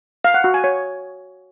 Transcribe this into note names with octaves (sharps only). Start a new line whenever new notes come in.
F5
F#5
F#4
G#5
C#5